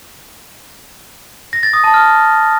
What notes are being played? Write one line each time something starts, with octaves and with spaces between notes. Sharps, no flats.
A#6
A6
D#6
A5
F6